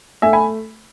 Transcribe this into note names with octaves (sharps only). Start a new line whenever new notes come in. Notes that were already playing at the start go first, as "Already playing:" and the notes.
A3 E5 G#5
G#5 B5